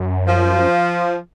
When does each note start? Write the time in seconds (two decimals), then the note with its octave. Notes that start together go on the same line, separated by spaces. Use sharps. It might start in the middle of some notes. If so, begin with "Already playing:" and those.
Already playing: F#2
0.27 F3